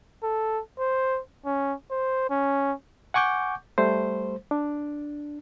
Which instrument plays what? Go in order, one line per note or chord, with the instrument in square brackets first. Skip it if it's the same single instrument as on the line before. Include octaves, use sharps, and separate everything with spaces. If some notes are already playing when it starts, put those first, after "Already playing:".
[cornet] A4
C5
C#4
C5
C#4
[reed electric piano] F#5 G#5 C#6 D6 G6
G3 A3 C5
D4